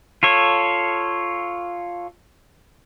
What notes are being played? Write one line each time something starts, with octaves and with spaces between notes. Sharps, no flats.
F4 A4 C#5